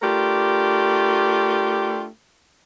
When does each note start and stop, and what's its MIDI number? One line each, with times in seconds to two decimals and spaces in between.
0.03 2.05 57
0.03 2.05 62
0.03 2.05 65
0.03 2.05 67
0.03 2.05 70